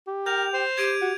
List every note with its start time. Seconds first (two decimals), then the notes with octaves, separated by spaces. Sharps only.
0.07 G4
0.26 A#4 G5 G6 F7
0.54 C5
0.78 G4 G#6 D7 D#7
1.02 F#4